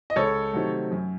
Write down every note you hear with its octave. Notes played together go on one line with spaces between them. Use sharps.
D#5
C#2 A4 C#5
C3 D#3 F#3 A3
F#2